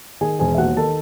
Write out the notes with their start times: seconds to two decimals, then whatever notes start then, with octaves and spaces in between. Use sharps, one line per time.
0.21 D#3 G#4 G#5
0.39 E1 G#4 G#5
0.54 E5
0.58 D#2 F#4 F#5
0.77 D#3 A4 A5